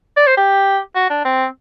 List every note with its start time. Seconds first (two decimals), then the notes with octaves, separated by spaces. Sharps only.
0.17 D5
0.27 C5
0.37 G4
0.95 F#4
1.10 D4
1.25 C4